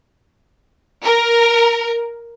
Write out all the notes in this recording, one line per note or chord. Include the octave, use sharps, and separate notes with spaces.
A#4